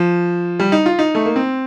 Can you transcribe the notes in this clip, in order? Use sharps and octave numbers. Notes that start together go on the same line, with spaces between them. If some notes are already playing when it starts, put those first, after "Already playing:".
Already playing: F3
G3
D#4
F4
D#4
A3
A#3
C4